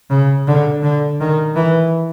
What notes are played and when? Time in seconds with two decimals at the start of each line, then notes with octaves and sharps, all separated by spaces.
0.10 C#3
0.47 D3
0.83 D3
1.20 D#3
1.56 E3